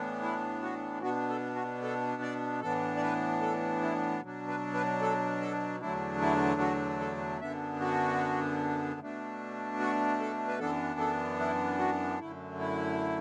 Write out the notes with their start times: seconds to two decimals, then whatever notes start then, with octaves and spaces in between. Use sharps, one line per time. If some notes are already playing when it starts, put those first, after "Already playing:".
Already playing: A2 E3 B3 D4
0.23 E4
0.63 F#4
1.02 B2 B3 D4 F#4
1.29 A4
1.55 F#4
1.83 A4
2.22 D5
2.61 A2 E3 B3 D4 A4
2.97 D5
3.02 B4
3.41 A4
3.82 E4
4.22 B2 F#3 D4
4.48 B4
4.74 B4
5.01 A4
5.41 A4
5.80 E2 D3 F#3 A3 D4 E4
6.21 E4
6.61 F#4
7.00 A4
7.40 F#2 D3 B3 D4 E5
7.80 F#4
9.00 B2 A3 D4
9.80 F#4
10.20 A4
10.48 B4
10.59 F#2 E3 B3 D4 A4
10.99 A4
11.40 E4
11.79 F#4
12.19 F#2 D3 A3 E4
12.59 E4